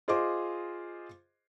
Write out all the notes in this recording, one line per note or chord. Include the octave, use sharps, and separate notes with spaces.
F4 G#4 C5 D#5 C6 D6